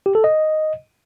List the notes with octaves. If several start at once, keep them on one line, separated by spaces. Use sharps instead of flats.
G4
A4
D#5